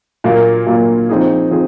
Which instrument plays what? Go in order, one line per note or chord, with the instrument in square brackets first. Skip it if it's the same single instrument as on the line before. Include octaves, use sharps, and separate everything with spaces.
[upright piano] A#2 F#3 A#3
A#2 F#3 A#3
F3 C4 D#4 G#4
F3 C4 G#4